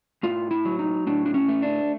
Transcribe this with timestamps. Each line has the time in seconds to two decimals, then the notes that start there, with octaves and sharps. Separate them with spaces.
0.23 A2 F4
0.51 E4
0.65 F#3
0.79 D#4
1.07 A2 D4
1.26 D4
1.34 C#4
1.48 A3
1.62 D4